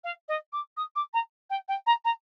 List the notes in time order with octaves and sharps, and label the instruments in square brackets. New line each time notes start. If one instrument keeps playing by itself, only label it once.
[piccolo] F5
D#5
D6
D#6
D6
A#5
G5
G5
A#5
A#5